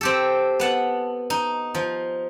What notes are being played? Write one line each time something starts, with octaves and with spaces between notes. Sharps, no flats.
C4 G4 A4
B3 F#5 A5
D#4
F3